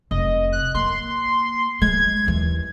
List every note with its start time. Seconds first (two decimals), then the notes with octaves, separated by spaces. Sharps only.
0.11 F1 D#5
0.52 F#6
0.75 A#3 C6
1.81 G#3 G#6
2.26 D#2 E3